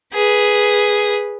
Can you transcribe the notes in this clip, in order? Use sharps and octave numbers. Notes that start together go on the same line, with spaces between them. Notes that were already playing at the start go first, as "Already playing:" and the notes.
G#4 B4